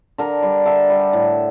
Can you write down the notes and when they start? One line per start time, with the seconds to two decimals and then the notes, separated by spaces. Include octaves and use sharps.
0.18 D3 A#4
0.43 G3
0.66 D3 E5
0.90 G3
1.13 A2